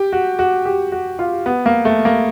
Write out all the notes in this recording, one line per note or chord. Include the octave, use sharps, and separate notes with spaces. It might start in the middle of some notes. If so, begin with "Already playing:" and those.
Already playing: G4
F#4
F#4
G4
F#4
F4
B3
A#3
A3
A#3